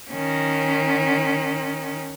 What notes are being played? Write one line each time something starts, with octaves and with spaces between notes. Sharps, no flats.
D#3 C#4